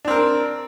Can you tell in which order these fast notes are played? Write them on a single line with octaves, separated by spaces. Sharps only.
D4 C4 A#4